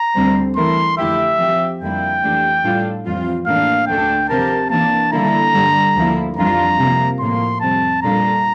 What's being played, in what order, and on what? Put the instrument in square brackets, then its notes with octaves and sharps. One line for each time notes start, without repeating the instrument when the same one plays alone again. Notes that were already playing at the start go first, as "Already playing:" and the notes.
Already playing: [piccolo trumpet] A#5
[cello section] D2 D3 G3 C4
[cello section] E3 A3 E4 A#4 [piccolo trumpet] C6
[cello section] F2 D3 A3 E4 G4 [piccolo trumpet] E5
[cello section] F3 C4 G4
[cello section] F2 D3 G3 A#3 E4 [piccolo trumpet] G5
[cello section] F2 E3 A3 D4 G4
A2 G3 D4 F4 A4
F2 E3 G3 C4 F4
[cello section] A2 E3 A#3 D4 [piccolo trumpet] F5
[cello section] D2 D3 A3 D4 A4 [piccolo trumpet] G5
[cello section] C3 F3 C4 G4 A#4 [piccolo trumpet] A5
[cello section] E3 A#3 D4 [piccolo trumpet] A5
[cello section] D3 G3 A#3 E4 A4 [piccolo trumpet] A#5
[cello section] G2 D3 G3
D2 D3 F3 A#3 E4
[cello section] F2 E3 G3 D4 F4 [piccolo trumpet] A#5
[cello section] C3 F3 A#3
[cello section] A2 F3 A#3 [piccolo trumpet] C6
[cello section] F2 C3 G3 C4 [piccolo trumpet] A5
[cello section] A#2 G3 D4 F4 A4 [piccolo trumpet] A#5